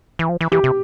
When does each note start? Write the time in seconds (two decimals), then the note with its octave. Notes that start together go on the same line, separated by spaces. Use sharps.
0.19 E3
0.29 F3
0.41 E3
0.52 E3 G4
0.64 C3